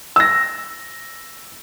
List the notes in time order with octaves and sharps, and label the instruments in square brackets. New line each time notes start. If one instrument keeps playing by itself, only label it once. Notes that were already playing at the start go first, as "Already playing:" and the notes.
[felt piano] E6 A#6